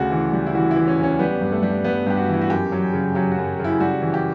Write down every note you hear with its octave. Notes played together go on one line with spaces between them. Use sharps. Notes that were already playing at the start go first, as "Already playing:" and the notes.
Already playing: D2 C#3 F#4
E3
G3
E4
E3 F#4
E4
E3
C#4
E2 C#4
G3 B3
G2
A3
G3
G2 B3
G2 G4
F#4
E3
E4
F#4
F#2 G4
F#3
C#3
F#3 G4
F#4
F#2
C#3 E4
G3 F#4
E3
G4